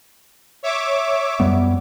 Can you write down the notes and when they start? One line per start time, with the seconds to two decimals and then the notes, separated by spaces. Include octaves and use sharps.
0.63 C#5 E5 D6
1.40 F#2 G3 B3